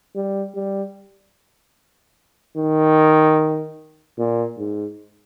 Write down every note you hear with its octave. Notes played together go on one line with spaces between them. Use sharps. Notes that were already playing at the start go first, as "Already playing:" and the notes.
G3
G3
D#3
A#2
G#2